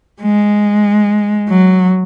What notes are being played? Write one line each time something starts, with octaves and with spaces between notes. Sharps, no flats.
G#3
F#3